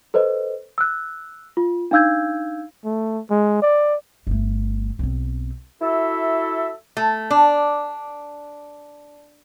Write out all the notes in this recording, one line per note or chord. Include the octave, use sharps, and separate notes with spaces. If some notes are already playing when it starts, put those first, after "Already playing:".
A4 B4 C5 D#5
E6 F#6
F4
D4 D#4 F5 E6 G6 G#6
A3
G#3
D5
G1 A3
B1 C4
E4 F#4 A4 E5
A3
D4